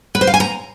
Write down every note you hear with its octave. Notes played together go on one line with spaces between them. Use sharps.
B4
C5
F5
G#5
A#5